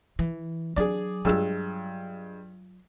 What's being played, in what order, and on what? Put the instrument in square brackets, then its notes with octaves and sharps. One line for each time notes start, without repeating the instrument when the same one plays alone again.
[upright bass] E3
[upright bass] F#3 D4 [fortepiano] G#4 D5
[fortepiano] G2 G#3 E6 [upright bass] F#3 F4